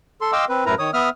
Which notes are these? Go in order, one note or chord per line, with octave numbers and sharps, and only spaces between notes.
A4 C6
D#5 F5 G5 C6 D6 E6
C4 B4
F#2 A2 E4 A#4 B4 A#5
D#3 C#5 D#6
B3 E5 D#6 F6